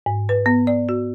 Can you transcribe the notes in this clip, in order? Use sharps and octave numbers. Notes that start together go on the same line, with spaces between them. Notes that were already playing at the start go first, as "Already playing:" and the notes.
G#2
B4
B3
D5
F#4